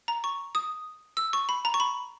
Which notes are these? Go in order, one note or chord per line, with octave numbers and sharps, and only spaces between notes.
A#5
C#6
D#6
E6
C#6
B5
A#5
C#6
B5